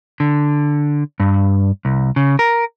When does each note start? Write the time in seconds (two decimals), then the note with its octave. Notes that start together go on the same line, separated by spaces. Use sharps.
0.20 D3
1.20 G2
1.85 C2
2.16 C#3
2.39 A#4